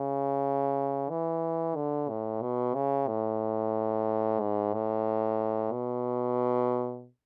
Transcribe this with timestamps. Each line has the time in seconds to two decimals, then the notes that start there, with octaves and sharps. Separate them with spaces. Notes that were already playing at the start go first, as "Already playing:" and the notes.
Already playing: C#3
1.10 E3
1.76 D3
2.09 A2
2.42 B2
2.75 C#3
3.08 A2
4.40 G#2
4.74 A2
5.72 B2